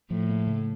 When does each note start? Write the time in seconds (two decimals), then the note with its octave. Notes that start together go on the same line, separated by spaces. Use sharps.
0.11 A2 F3
0.29 A#3
0.47 C#3